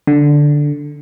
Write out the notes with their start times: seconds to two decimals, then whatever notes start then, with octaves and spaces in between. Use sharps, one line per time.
0.07 D3